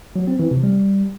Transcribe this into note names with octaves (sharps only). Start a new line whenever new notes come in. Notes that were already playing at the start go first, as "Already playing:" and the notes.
F#3
C4
E3
C3
G3